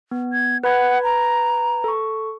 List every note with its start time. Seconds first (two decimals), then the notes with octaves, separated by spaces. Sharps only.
0.11 B3
0.33 G#6
0.64 B4 F#5 B5 G#6
1.03 A#5
1.84 A4 C#6